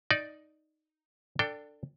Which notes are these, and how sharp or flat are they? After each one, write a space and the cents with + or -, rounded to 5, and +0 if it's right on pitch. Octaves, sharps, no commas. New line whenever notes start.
D#4 +0 D5 +0
D4 +5 A4 +25 G5 +0